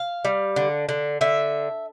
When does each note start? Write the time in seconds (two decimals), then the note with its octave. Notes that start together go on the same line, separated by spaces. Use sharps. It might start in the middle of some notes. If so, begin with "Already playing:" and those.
Already playing: F5
0.25 G3
0.56 D3
0.89 D3
1.21 D3 E5